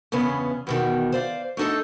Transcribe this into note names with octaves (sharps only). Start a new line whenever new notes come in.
E2 G2 C#3 B3 C#4
E2 B2 D#3
C5 D5 F5
A3 D4 D#4 A4 D#5